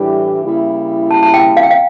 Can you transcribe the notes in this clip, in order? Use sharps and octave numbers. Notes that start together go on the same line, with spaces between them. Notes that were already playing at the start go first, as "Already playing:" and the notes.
Already playing: A2 E3 G3 D4 G4
C#3 G3 A#3 E4
A5
A5
G5
F5
G5
F5